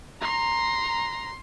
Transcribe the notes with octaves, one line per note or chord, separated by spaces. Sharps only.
A#5 C6